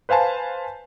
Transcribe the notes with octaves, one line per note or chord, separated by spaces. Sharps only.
B4 C5 F5 G#5 A5